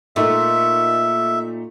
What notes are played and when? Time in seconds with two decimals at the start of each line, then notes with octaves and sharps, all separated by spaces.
0.16 A#2 A3 D#4 E5